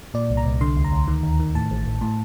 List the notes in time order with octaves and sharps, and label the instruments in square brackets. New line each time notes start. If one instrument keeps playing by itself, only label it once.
[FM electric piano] A#2 D5
C2
A#5
C2
D3 C6
D2
A#5
D2
D#3
D#2
D#3
A2 A5
A1
A1
A2